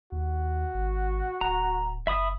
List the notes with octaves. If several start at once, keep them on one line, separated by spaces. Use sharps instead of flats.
D#2 F#4
G#1
D1 A#5
F#1 E5 B5 D#6